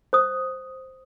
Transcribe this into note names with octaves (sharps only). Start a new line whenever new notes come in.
C5 D#6